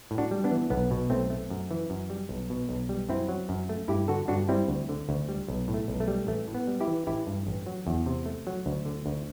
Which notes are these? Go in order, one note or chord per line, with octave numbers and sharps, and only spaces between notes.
A2
D4 F#4
G3
B3 D4
E3
B1 B3
B2
B1 A3 C4
A3
F#2
E3
F#2
G3
B1
B2
B1
G3
F#2 C4 E4
F#3
F#2
A3
G2 E4 G4
D3 F#4 A4
G2 D4 F#4
G3 C4 E4
D2
D3
D2
G3
B1
A2
A3
B1
A3
G3
A1 A3
A2
B3
G3
E4 G4
E3
A1 E4 G4
G2
A1
F#3
E2
C3
A3
F#3
D2
D3
D2